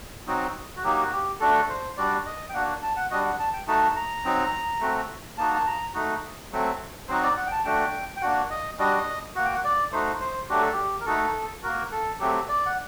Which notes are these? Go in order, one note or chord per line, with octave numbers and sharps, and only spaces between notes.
F#3 C4 D#4 F#4
F#4
F#3 A#3 D#4 G4
F#4
G4
A3 D4 F#4 A4
C5
G3 D4 F#4 D5
D#5
G5
A#3 D4 F#4 F#5
A5
F#5
G3 D4 F#4 D#5
F#5
A5
G5
A3 D#4 F#4 A5
A#5
F#3 C4 D#4
A3 C4 F#4
A#3 D#4 F#4 A5
A5
A#5
A3 D#4 F#4
F#3 A3 C4
F#3 C4 D#4 F#4 C5
D5
F#5
G5
A5
A3 D4 F#4 G5
G5
A#3 D4 F#4 F#5
D#5
G3 D4 F#4 D#5
A#3 F#4 F#5
G5
F#5
D5
A3 D#4 F#4 C5
C5
F#3 A3 D4 F#4 G4
A4
G4
A#4
A3 D#4 F#4 A4
A#3 F#4 A#4
A4
F#3 A3 C4 G4
D5
F#5